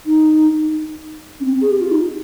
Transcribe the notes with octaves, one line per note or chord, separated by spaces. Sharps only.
D#4
C#4
C4
G#4
G4
F4
D#4